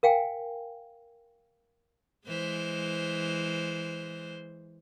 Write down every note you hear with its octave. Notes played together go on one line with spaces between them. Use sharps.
A#4 F5 G5 G#5
E3 G#3 C5